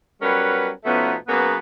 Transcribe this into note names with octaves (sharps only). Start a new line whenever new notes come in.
F#3 G3 B3 C#4 A#4 B4
B2 F3 A3 B3 C#4 D#4
C#3 F#3 A#3 B3